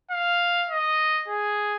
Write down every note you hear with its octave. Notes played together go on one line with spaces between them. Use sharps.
F5
D#5
G#4